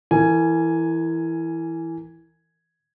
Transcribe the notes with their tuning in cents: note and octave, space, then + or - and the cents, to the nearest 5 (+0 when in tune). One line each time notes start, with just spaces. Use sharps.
E3 +0 A#4 -40 G#5 +0